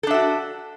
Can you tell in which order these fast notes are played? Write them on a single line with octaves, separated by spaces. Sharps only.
A4 D4 E5 F#4